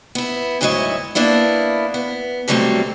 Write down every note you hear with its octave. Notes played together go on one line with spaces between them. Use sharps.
B3 E4
D2 G#2 F#3 E4 C#5 D#5
A#3 B3 D4 E4
B3
B2 D3 F#3 G3 A3 C4